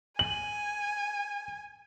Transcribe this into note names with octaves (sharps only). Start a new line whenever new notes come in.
G#5 F#7